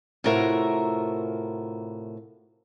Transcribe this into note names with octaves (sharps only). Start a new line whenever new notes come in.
A2 C3 F4 F#4 A#4 E5